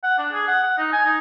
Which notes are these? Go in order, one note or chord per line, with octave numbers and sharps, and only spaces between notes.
F#5
D4
G#4
F#5
F#5
D#4
G#5
D#4